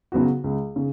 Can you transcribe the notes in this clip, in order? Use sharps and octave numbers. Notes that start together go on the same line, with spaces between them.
C#3 F#3 B3 F#4
C#2
C#3